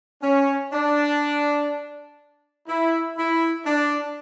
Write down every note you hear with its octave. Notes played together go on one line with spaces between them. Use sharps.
C#4
D4
E4
E4
D4